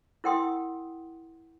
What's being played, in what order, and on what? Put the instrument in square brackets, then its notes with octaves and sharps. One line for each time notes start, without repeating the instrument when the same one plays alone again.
[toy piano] E4 A#4 F#5 G5 C6 D#6